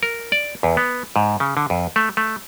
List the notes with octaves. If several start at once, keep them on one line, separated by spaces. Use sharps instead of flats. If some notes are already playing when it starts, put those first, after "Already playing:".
A#4
D5
E2
B3
G#2
C#3
D3
F2
A3
A3